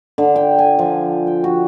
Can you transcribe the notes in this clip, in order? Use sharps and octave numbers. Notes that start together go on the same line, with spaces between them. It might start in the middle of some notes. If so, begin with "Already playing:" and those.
D3
G5
G#5
F3
G5
F#4